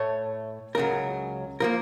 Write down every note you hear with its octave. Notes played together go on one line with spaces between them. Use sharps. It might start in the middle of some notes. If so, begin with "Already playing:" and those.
Already playing: A2 A3 C#5
C#2 C#3 F#3 A#4
F3 A#3 A#4